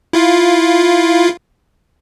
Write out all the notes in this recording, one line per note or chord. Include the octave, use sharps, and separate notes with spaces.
E4 F4 F5